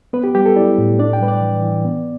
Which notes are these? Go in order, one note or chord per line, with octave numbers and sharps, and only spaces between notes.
B3 B4
G4
G3 G4
A4
E4 D5
A2
D4 D5
G5
G3 B4
D5
E3
E3
B3